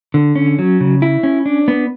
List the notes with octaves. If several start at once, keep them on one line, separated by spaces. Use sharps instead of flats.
D3
C#4
F#3
C#3
E4
C#4
D4
B3